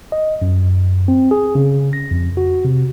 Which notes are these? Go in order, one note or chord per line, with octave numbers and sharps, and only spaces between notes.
D#5
F#2
C4
G#4
C#3
A#6
F2
F#4
C3